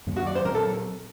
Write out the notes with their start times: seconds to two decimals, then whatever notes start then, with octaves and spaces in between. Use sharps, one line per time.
0.07 F#2 D#3 F#3 A#3
0.16 F#4
0.26 D5
0.35 C5
0.45 A#2 F#3 C4 A#4
0.55 A4